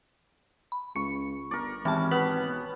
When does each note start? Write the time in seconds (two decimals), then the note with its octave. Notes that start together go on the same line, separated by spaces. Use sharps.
0.72 B5
0.96 C#2 C#6 C#7
1.51 G1 A#4 D5
1.85 G#1 E3 G3 C#4 A5
2.11 B3 B4
2.48 B2